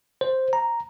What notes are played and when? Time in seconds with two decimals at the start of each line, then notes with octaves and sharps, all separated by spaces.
0.21 C5
0.53 A#5